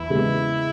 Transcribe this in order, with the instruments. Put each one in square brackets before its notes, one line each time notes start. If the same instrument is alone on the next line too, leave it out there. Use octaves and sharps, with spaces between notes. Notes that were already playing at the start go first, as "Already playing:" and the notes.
Already playing: [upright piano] E2 [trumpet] E4
[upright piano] C#3 G#3 B3